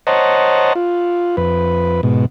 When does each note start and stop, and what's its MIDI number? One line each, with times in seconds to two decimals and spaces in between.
0.07 0.73 72
0.07 0.73 73
0.07 0.73 75
0.07 0.73 78
0.07 0.73 81
0.07 0.73 82
0.75 1.36 65
1.37 2.01 41
1.37 2.01 71
2.03 2.26 44
2.03 2.26 47